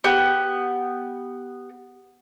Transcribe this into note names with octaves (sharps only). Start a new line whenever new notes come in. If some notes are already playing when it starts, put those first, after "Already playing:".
B3 G4